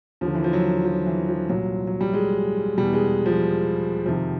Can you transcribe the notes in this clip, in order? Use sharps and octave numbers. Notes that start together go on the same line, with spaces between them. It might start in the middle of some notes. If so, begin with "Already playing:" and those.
D#2 D3 F3
E3
F3
F#3
F3
E3
F3
C2 A#2 F#3
F#3
G3
G#3
E2 B2 G3
G#3
F3
F2 C3 D#3 F3